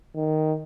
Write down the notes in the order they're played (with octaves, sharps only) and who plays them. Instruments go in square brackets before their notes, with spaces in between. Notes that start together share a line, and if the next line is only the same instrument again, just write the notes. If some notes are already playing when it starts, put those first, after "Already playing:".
[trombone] D#3